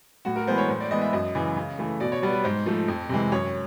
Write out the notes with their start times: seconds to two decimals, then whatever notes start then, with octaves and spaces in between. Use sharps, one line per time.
0.25 A2 F#4
0.36 A#4
0.47 E3 G#3 B3 C5
0.58 C#5
0.69 A2 C5
0.80 D5
0.91 E3 G#3 B3 D#5
1.01 E5
1.13 F#2 D#5
1.35 C#3 E3
1.56 C#3
1.79 E3 A3
2.00 B2 D5
2.12 C#5
2.22 G3 B3 D5
2.33 B4
2.44 G#2 C5
2.66 F3 A3
2.88 F2
3.09 C3 E3 G#3
3.32 F#2 C#5